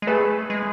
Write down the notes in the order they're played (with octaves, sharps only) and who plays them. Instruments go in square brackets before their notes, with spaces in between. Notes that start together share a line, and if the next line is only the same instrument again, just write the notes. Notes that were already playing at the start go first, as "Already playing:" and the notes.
[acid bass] G#3
[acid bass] A3 [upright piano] G#4 B4
[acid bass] G#3